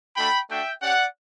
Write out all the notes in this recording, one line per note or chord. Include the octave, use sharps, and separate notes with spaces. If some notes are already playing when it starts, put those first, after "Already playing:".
A3 D4 F#4 G5 B5
A3 D4 F#4 E5 G5
C#4 G4 D5 F#5